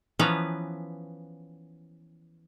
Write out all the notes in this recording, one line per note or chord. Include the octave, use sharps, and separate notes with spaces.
E3 F3 B3 C#4 B4 A#5